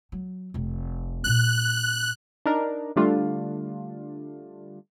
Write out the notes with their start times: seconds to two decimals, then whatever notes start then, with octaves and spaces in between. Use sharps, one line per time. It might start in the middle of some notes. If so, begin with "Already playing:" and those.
0.12 F#3
0.54 F1 C3
1.24 A#2 C#4 F#6
2.46 D4 D#4 A#4
2.96 D3 G3 A3 D4 F4